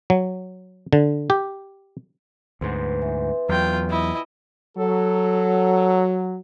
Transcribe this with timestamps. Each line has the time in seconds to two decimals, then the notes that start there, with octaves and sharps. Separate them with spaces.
0.10 F#3
0.93 D3
1.30 G4
2.61 D2 G#2 B3 C5
3.02 E3
3.49 E2 F#3 F4 G5
3.89 E4 D#5
4.77 F#3 A4